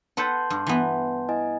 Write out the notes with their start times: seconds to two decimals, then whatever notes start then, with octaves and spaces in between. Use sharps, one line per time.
0.17 A4 B4 F#5 A5 C6 G6
0.50 G2
0.67 E3 B3
1.29 E4 D#5 G#5